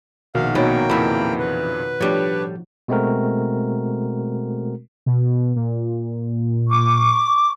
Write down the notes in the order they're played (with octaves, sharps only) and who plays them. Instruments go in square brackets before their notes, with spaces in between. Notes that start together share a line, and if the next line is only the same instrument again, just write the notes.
[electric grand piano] A#1 A#4 [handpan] B2 D#3 F#4 [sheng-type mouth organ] F5
[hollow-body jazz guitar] B2 F#3 C#4 [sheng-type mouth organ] A#3 G5 [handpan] D#4 F#4 C#5
[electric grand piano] F2 A#2 C#3 [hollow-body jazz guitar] E3 E4
[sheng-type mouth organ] B4
[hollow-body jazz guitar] A2 G3 [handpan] F3 [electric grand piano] D4 G4 C#5
[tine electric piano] B2 G#3 A3 C4 F#4 A#4
[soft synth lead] B2
A#2
[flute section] C#6 D6